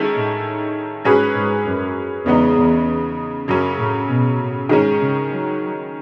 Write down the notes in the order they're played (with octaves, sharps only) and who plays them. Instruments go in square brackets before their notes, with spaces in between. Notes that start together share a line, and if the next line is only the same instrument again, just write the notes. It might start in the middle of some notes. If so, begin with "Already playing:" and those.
Already playing: [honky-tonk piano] D#3 G#3 C#4 E4 A4
[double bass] A2
[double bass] G#2 [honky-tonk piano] F#3 C#4 G#4 B4
[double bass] G#2
F#2
[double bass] E2 [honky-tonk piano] C#3 G#3 B3 D#4
[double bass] E2
[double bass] F#2 [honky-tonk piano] C#3 F#3 C#4
[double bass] A2
B2
A2
[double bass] G#2 [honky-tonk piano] D#3 G#3 C#4
[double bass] C#3
F#3